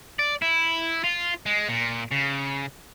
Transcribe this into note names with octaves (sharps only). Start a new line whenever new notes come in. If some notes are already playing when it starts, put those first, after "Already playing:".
D5
E4
F4
G#3
A#2
C#3